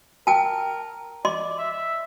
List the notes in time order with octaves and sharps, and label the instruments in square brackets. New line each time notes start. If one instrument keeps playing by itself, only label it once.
[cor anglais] A#4 [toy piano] G5 A5
[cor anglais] D5 [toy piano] D#5 C6
[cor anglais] E5
E5